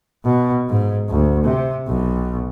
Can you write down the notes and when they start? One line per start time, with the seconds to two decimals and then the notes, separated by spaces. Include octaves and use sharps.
0.25 B2
0.69 G#2
1.09 D2
1.44 C3
1.87 B1